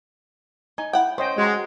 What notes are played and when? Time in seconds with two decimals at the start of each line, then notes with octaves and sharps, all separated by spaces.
0.78 D#4 G#5
0.93 E4 F#5 G5
1.18 C#4 C5 D#5 G5
1.38 G#3 F#4 A#5